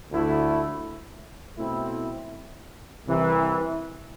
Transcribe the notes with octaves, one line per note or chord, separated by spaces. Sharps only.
D2 D3 A3 E4
B2 A3 C4 E4
C2 C3 E3